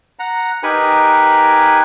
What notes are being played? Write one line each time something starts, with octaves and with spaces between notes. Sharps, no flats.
F#5 A#5
D#4 G4 A#4 B4 G#5 B5